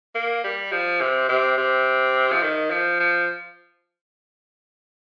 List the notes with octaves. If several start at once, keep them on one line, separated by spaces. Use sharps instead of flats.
A#3
G3
F3
C3
C3
C3
F3
D#3
F3
F3